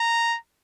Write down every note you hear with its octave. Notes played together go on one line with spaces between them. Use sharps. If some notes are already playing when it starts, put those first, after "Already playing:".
Already playing: A#5